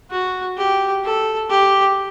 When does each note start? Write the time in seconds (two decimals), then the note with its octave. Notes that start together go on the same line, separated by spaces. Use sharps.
0.11 F#4
0.58 G4
1.04 A4
1.50 G4